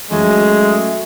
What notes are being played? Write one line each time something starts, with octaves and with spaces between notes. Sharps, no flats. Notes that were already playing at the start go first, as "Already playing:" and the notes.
F#3 G#3 A3 C#4